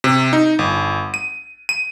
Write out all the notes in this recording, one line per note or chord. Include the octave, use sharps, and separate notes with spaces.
C3
D#4
G1
D#7
D#7